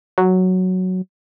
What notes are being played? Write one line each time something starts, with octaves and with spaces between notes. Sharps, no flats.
F#3